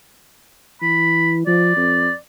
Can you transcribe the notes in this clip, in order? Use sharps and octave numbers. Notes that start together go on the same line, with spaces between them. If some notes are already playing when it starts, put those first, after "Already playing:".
E3 B5
F3 D5
F2